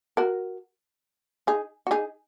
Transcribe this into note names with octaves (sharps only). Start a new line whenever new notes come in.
F#4 A#4
D#4 G#4
F#4
D#4 G#4